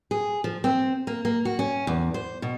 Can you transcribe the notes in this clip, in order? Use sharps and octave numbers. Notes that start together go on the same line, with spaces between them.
G#4
F3
C4
A#3
A#3
F#4
C#4
E2
C5
B2